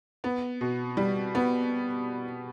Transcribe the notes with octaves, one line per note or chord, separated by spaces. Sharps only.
B3
B2
G3
B3